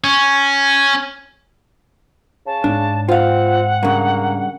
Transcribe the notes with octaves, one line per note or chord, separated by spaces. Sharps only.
C#4
C#3 A5
G#2 D4
C4 F4 F5 F#5
G2 C#3 A#3